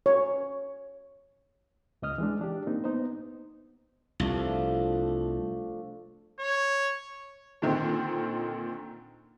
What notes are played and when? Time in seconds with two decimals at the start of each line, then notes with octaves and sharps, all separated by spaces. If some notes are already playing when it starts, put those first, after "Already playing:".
0.06 C#5
2.02 C#2 C#3 D#5 D#6 F6
2.18 E3 G#3 D4
2.41 D4 G4
2.67 A#3 C4 D#4
2.84 B3 D#4 C5
4.20 C2 F3 A3 D4
6.39 C#5
7.62 A#2 D3 D#3 C4